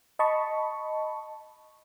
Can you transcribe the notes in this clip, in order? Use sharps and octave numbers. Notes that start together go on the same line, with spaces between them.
D#5 A5 B5 C#6